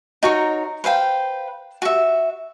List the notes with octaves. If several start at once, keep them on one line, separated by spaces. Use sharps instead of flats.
D#4 F#4 A#4 C#5
B4 C5 F5 G5
F#4 E5